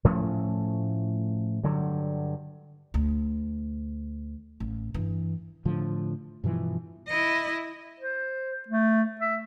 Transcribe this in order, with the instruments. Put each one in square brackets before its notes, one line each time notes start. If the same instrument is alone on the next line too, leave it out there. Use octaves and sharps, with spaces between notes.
[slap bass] A2 F3 A3 C#4
G2 D3 F#3
[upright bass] D2
A1
G2 E3
[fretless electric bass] A2 D3 F3
G2 B2 E3 F3
[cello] E4 D#5
[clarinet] C5
A3
E5